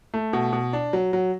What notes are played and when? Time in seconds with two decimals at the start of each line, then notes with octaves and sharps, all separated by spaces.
0.14 A3
0.33 B2
0.53 B2
0.73 D4
0.93 F#3
1.13 F#3